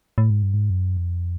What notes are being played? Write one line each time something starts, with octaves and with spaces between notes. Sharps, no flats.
A2
G#2
G2
G#2
F#2
F2